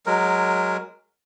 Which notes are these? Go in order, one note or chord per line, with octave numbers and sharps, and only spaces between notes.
F#3 G#3 A#4